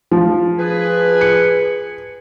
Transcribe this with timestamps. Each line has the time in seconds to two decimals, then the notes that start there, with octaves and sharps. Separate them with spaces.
0.11 F3
0.59 G#4 B4 G#5
1.21 C#7